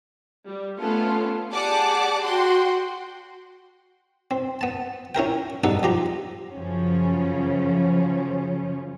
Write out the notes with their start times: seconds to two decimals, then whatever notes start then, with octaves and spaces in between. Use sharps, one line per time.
0.45 G3
0.78 A3 B3 C#4 F4 A4
1.52 G4 G#4 D5 F#5 A5 D6
2.23 F#4 F#5 G5 C6
4.31 C4
4.61 B3 A5
5.15 C#4 E4 A#4 G5
5.64 B1 G2 D#4 A4 F#5
5.83 F3 G4 A#5
6.50 F#2 C#3 F3 C#4